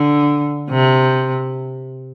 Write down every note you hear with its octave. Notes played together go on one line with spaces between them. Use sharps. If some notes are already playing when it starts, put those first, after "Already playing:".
Already playing: D3
C3